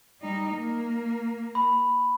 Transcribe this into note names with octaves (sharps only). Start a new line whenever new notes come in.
G3 D#4
A#3
B5